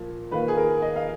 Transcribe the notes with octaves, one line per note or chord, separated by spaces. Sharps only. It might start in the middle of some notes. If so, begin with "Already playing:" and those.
Already playing: A#2 F3 A#3
D#3 A#3 F4 B4
G#4
A#4
D#5
F5